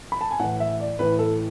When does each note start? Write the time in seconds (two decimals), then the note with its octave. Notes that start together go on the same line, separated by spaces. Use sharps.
0.12 B5
0.21 A5
0.31 G#5
0.39 A2 E3 F#5
0.60 E5
0.80 D5
0.99 A2 E3 B4
1.19 A4